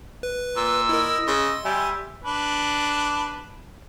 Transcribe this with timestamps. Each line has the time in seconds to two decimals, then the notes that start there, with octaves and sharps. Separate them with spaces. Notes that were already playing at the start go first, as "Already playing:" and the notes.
0.23 B4
0.56 A#2 E6
0.89 E4 A#4 D#5
1.28 C#3 C6 E6
1.65 G3 E5 G#5
2.24 D4 B4